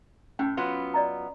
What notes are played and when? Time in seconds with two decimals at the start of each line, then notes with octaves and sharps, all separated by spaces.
0.39 A2 C#4 G5
0.57 F#3 B3 F4
0.94 D5 D#5 A#5